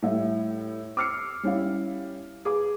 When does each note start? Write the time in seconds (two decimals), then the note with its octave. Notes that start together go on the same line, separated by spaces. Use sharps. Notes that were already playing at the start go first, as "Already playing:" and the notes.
0.02 A2 G3 E5
0.97 D6 E6 F6 C7 C#7
1.43 G3 C#4 E4 F5
2.45 G#4 B4 F5 D6